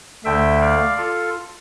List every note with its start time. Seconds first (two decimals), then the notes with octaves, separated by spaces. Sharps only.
0.25 D2 D3 A3 E5 G5
0.61 D5 F5
0.97 F4 A4